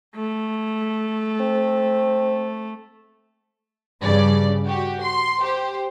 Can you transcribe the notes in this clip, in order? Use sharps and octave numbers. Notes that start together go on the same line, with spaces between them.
A3
C4
G2 C#3 D5
F#4 G4
C6
G4 C5